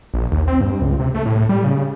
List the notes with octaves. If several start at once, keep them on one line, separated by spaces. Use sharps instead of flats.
A#1
D#2
C4
G2
C#2
C3
A3
A2
G3
C#3